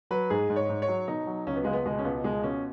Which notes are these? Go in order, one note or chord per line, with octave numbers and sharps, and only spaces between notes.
F#3 B4
G#2 G#4
G#2
C#5
G#2
C#5
F#3
B2 D#4
F#3
C#2 C#4
B3
C#2 G#3
B3
B2 G#3
C#4
C#2 B3
B2 G#3
B2 C#4